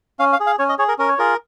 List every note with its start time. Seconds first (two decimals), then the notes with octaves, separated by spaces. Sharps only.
0.19 C#4 F5
0.33 F5
0.40 G#4
0.47 F5
0.59 C#4 C#5
0.69 D#5
0.79 G#4 C#5
0.88 A#4
0.99 C#4 A#4
1.09 C#5
1.18 F4 G#4 A#4